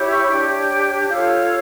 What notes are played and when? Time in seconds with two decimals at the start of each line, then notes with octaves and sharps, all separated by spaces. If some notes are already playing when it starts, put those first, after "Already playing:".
Already playing: E4 G4 C#5
0.10 C#6
0.30 D4 G4 C#5 G5
0.69 G5
1.08 F4 A4 C#5 F5